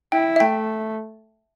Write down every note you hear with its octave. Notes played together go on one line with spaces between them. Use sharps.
E4 G5
E5
A3 G5